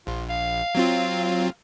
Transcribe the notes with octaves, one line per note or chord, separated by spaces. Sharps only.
A#1 F4
F5
F#3 C4 F4
F5